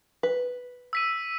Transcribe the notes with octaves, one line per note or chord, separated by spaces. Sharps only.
B4
E6 B6 D#7